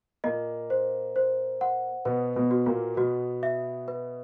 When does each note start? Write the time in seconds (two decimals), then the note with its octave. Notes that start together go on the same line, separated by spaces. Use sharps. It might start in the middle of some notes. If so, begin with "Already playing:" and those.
0.24 A#2 A#3 D#5
0.70 C5
1.16 C5
1.61 F#5
2.05 B2 B3 B4
2.36 B2 B3
2.51 F#4
2.66 A#2 A#3
2.96 B2 B3 F#4
3.43 E5
3.88 B4